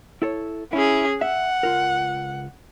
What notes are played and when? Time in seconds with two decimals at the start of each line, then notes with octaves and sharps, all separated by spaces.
0.22 E4 A4 C#5
0.73 C#4 E4 G#4
1.21 E5 F#5
1.63 C#2 F4 A#4